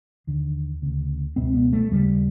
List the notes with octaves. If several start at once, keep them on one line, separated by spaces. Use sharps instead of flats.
D#2 D3
D2 C#3
C#2 B2 C4
B3
A3
D#2 C#3 G3